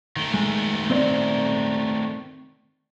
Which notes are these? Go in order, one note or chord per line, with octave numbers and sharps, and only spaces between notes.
D#3 A3
G#3
C4 C5 D5